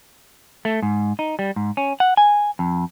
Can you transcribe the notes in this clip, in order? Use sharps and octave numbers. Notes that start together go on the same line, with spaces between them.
A3
G#2
D#4
G3
G#2
C#4
F#5
G#5
F2